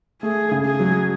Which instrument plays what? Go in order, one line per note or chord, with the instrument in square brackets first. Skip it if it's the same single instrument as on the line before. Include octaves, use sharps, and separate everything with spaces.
[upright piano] A3 [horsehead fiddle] G#4
[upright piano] C#3
[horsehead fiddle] G#4
[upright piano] F#3